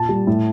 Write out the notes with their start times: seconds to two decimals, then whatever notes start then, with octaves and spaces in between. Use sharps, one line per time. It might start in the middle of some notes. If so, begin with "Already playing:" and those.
Already playing: A#2 A5
0.09 G3
0.27 A2